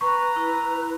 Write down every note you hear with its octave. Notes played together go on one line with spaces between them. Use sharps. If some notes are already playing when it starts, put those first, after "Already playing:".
B4 A#5 C#6
E4